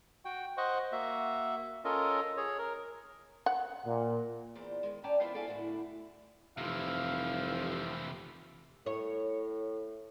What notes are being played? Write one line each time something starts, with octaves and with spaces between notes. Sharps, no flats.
F#4 G5
C5 D#5 F#5 C#6
A#3 F#4 E5
C#4 F4 A4 A#4 D#5
G#4 C#5
A#4
F#5
A#2
E2 A#2 E3 C5 D5
D#3 G#3
C#4 D5 G5 A5 A#5
E3 B3 F4 C5 E5
F#4 A4 D5 E5 F5 G#5
A2 D3 E4 F#4
F1 C3 E3 F3 E5 F5
A2 C#5